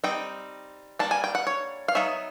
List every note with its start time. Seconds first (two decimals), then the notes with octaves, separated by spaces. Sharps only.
0.04 G3 C4 D#4 G5
0.99 G3 A#3 D4 A5
1.11 G#5
1.24 G5
1.35 F#5
1.47 C#5
1.88 F5
1.95 F#3 B3 D#4 E5